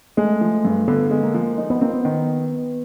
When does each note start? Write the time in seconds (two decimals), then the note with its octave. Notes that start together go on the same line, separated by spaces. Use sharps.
0.17 G#3 A3
0.41 F3
0.65 G2
0.88 D3 B3
1.11 G#3
1.23 A#3
1.34 F3
1.58 D#4
1.70 B3
1.81 A#3 C4
1.94 B3
2.05 D#3